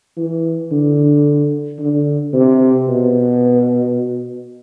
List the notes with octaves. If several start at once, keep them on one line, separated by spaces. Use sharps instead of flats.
E3
D3
D3
C3
B2